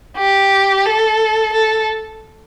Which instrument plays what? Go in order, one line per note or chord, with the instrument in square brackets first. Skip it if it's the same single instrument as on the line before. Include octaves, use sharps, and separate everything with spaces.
[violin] G4
A4
A4